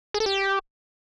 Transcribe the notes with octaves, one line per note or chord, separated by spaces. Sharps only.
G#4
A4
G4